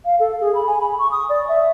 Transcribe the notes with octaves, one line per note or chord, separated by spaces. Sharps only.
F5
A4
G#4
B5
G#5
B5
C#6
D#6
D5
E5